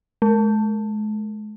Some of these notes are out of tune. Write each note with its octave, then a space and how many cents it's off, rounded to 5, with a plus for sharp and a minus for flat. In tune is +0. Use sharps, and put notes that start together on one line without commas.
G#3 +40